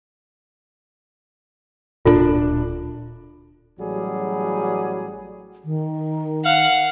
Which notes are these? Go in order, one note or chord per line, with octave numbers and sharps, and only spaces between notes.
D1 A#2 D4 F4 A4
A1 F#3 G3 F#4 G#4
D#3
F5 F#5